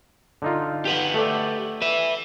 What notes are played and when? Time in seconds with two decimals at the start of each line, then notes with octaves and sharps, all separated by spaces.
0.42 D3 D#4 F4
0.85 G4 B4 F#5
1.14 A3 A4 D5
1.82 B4 E5